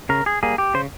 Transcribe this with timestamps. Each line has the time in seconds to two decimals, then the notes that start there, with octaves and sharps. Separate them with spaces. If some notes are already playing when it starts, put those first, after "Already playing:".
0.09 C#3 A#4
0.26 G#4
0.43 G3 A#3 G#4
0.58 G4
0.74 C#3 C5